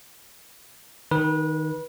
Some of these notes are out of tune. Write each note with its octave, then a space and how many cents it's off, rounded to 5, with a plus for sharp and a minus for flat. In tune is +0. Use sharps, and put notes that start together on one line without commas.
D#3 +0 B4 -30